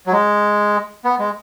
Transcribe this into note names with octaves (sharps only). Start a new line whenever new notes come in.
F#3
G#3
B3
G#3